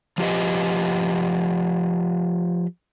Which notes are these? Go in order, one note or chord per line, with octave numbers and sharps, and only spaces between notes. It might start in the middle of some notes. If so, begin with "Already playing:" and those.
F3 F4 G4 A4 B4 D#5